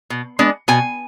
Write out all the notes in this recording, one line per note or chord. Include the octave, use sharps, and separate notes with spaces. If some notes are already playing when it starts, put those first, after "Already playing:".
B2
G#3 B3 D4
B2 G#5